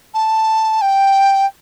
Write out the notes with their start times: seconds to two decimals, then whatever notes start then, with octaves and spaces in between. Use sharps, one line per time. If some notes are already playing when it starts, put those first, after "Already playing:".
0.14 A5
0.81 G5